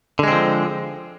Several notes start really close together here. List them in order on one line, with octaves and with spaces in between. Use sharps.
D3 G#3 C4 F3